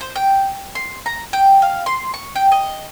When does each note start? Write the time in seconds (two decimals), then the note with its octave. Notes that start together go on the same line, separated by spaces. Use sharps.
0.01 C5
0.16 G5
0.75 C6
1.06 A#5
1.33 G5
1.62 F5
1.86 C6
2.14 C#6
2.36 G5
2.52 D#5